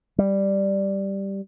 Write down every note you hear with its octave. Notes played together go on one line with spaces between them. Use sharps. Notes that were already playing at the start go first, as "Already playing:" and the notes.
G3